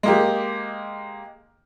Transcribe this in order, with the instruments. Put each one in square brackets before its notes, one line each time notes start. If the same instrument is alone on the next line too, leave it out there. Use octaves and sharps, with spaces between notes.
[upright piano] G#3 A#3 G4